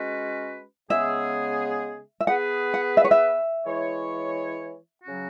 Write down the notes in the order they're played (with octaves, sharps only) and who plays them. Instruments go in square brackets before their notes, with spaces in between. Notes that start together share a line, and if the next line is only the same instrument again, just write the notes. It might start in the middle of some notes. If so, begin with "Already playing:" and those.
Already playing: [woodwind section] G#3 C#4 F#4 B4
[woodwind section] C#3 G#3 B3 G#4 [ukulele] E5
[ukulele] E5
[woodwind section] B3 G#4 B4 [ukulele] F#5
[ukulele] F#5
E5
C#5
E5
[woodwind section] E3 G#3 E4 C#5
C#3 F#3 C#4 F#4